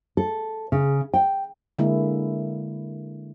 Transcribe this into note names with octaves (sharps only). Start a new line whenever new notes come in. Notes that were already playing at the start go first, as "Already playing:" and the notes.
A4
C#3
G5
D3 G#3 A#3 E4